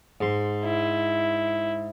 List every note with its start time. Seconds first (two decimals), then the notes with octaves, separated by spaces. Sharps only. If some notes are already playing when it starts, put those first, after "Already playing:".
0.21 G#2 C6
0.65 E4